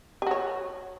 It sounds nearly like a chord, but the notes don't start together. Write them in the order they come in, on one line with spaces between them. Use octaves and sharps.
G4 F#4 C#5